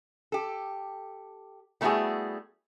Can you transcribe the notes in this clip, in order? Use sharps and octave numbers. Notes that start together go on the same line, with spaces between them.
G4 A4
G3 A3 B3 E4 F#4 G#4